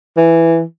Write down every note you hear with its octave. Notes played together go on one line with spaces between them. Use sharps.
E3